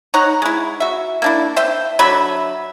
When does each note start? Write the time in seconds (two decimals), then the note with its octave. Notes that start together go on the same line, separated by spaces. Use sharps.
0.14 D#4 C#5 F#5 A#5
0.42 G#3 E4
0.80 F#4 E5
1.22 A#3 D4 E4
1.56 C5 E5 G5
1.99 D3 F#3 E5 B5